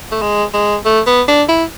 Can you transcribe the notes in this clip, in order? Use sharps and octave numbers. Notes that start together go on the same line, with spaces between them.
A3
G#3
G#3
A3
B3
D4
E4